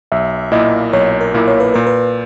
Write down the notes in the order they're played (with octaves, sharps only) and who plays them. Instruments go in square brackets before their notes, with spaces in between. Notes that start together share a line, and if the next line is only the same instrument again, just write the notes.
[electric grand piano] B1 [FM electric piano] E5
[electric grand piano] A#2 A#3 E4 [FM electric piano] D#5
[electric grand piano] B1 [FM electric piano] C#5
[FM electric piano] A#4
[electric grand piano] A#2 A#3 E4
[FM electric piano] C#5
B4
[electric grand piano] A#2 [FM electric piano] A#4
[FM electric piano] B4